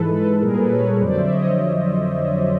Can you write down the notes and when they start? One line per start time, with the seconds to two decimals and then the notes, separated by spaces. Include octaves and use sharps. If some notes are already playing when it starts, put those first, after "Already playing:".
Already playing: G#2 E3 G#3 A4 B4
0.12 A4 B4
0.41 A#2 G3 G#4 A#4
0.57 A4 B4
0.72 B4 C#5
1.01 F2 D3 F#3 C5 D5
1.17 D5 E5
1.32 C#5 D#5